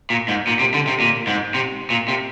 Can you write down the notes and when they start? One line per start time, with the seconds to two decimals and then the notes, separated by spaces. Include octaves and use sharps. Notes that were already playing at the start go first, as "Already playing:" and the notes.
0.10 A#2
0.28 G#2
0.47 A#2
0.59 C3
0.74 D3
0.87 C3
1.00 A#2
1.27 G#2
1.54 C3
1.90 A#2
2.08 C3